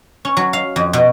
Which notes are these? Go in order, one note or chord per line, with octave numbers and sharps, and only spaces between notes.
C#4
F#3
F5
F2
B2